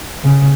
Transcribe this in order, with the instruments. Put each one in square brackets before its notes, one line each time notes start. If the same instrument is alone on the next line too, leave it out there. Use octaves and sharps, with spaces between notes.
[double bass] C#3